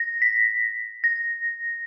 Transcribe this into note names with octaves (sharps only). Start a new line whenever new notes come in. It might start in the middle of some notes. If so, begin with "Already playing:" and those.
Already playing: A#6
B6
A#6